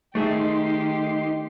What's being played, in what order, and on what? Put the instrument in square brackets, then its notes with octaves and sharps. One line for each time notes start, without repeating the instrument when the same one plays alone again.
[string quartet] D#3 G4 [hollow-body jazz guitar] A3 G#4 E5 [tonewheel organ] D#4 C6